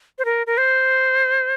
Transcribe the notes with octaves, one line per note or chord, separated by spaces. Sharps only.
C5
A#4
A#4
C5